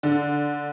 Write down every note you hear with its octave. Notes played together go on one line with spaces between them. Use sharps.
D3